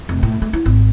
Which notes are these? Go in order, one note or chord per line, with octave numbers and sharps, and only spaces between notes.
F1
A2
A3
E4
G#1